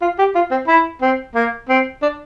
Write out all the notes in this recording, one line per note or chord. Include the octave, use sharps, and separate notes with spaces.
F4
G4
F4
C4
E4
C4
A#3
C4
D4